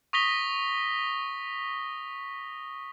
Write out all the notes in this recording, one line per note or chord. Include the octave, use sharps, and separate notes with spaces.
C#6 D#6 A#6 B6 G7